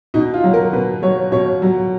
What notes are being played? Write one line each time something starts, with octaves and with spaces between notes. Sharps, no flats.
B2 D#4
F4
F#3
A#4
B2 B4
F#3 C#5
B2 C#5
F#3